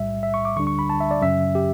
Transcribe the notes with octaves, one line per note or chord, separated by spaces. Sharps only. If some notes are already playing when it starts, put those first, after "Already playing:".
Already playing: B1 A2 G3 E5
E5
C#6
D6
D2 D3 G3 D4 C#6
C#6
B5
A5
E5
D5
F#2 C#3 F#3 C#4 E5
G4